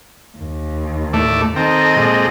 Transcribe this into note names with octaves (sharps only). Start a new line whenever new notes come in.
D#2
A2 A3 D5
D#3 C4 A4 D#5
A#2 G#3 C4